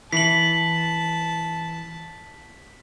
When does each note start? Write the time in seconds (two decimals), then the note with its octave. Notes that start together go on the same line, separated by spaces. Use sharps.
0.12 E3 A5 B6 F#7